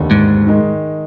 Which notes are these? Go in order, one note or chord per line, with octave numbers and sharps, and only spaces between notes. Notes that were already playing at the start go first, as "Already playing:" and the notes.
Already playing: F1 D#2 D3
G#2
D#3 G#3 D#4